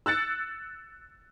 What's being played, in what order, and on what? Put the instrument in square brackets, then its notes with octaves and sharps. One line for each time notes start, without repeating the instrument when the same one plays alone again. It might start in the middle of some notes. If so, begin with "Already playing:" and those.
[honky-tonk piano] E6 F#6 A6 C#7